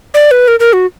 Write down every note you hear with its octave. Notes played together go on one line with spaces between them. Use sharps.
D5
B4
A#4
A#4
F#4